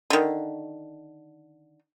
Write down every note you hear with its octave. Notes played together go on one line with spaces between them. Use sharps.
D3 D#3